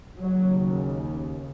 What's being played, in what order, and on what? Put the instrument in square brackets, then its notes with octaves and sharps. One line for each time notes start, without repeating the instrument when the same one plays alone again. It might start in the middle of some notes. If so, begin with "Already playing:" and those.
[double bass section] D#2 C#3 F#3